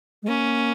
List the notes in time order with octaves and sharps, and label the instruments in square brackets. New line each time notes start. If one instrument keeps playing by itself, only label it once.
[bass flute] G#3
[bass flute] A#3 [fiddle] C#4